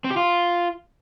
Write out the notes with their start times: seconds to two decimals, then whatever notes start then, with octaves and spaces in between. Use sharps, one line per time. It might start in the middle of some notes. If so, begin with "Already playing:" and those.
0.04 C4
0.11 G4
0.17 F4